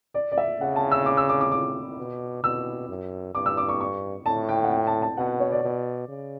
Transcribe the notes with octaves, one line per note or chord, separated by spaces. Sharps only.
D5
D5
E5
C#3 F#5
A5
E6
D6
E6
D6
D6
D6
B2
B2 E6
F#2
G2 D6
E6
D6
C#6
C#6
A2 A5
G5
F#5
G5
A5
A5
B2 F#5
C#5
D5
B2
C#3